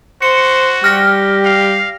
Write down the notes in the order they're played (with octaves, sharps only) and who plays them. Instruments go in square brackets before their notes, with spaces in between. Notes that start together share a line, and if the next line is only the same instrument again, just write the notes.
[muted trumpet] F#4 [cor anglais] C5 [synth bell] C#7
[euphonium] G3 [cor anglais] G4 [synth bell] F6 A#6
[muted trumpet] F5